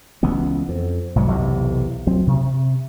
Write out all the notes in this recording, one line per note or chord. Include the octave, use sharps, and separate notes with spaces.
C#2 C#3 E3 B3
F2
B1 G#2 F3 F#3
B1 E2 C3
D2 F#3 C4
C3